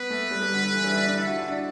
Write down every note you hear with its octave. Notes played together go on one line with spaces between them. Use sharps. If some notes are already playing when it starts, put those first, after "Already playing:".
Already playing: B3 B4
A3
G3
G3
D3
D3
E3
G3
E4
D4
D4
E4 A4
F#4
E4
D4